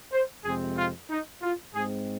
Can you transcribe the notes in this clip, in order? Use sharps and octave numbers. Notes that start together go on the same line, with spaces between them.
C5
F2 C3 G#3 C4 G#4
F4
D#4
F4
G#2 G#3 C4 G#4